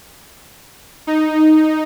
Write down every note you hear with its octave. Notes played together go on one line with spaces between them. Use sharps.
D#4